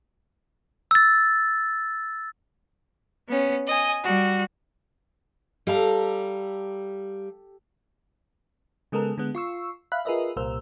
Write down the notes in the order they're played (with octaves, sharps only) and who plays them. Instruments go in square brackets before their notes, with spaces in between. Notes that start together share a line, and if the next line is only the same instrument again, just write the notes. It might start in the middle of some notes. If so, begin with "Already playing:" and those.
[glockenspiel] E6 A6
[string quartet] B3 C#4
D#5 G#5
G3 F#4
[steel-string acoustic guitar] G3 F5 A#5 [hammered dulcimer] G4 A4
[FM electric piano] C#3 G#3 B3 A4 A#4
D3 G#3 B3
F4 C#6 E6
E5 F5 B5 F#6
F4 G#4 A#4 B4 D#5 E5
C2 A#2 A#4 C5 E6